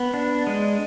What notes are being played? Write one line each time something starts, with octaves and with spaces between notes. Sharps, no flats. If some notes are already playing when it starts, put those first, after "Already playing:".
Already playing: B3
D4
G#3